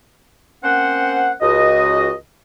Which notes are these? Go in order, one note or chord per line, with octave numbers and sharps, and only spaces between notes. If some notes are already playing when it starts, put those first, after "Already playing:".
A#3 C4 C#4 C5 F#5
C#2 F#4 D#5